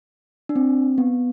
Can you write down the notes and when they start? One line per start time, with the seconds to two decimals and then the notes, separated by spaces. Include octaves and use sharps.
0.49 D4
0.56 C4
0.98 B3